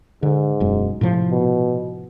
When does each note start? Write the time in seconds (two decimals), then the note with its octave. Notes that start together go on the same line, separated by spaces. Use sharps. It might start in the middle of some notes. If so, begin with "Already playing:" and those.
0.23 G#2 D3
0.60 E1 F#2 G#3
1.01 A2 C3 F3
1.31 B2